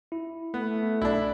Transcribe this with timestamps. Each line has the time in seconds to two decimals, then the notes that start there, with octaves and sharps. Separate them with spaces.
0.12 E4
0.54 A3 B3
1.02 B1 D4 E4